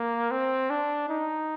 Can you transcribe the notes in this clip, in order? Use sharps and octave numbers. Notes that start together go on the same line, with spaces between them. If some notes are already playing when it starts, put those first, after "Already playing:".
Already playing: A#3
C4
D4
D#4